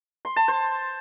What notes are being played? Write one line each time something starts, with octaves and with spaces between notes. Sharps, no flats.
C6
A5
C5